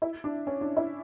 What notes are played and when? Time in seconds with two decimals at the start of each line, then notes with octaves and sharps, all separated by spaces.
0.02 E4
0.24 D4
0.47 C#4
0.61 D4
0.77 E4